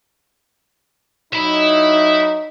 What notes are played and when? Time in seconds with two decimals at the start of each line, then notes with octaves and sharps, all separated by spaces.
1.33 F#3 D#4 E5 B5